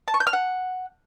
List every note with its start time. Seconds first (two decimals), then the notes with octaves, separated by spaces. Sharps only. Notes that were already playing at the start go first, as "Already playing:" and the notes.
0.08 A5
0.14 C#6
0.20 G6
0.27 F6
0.33 F#5